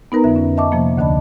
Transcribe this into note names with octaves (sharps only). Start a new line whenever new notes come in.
B3 D#4 A#4 B4 A#5
F2 D3 E5
C#4
D#5 E5 A5 C#6 D6
C3 F3 A#3
D2 D3 D4 D#5 A5 B5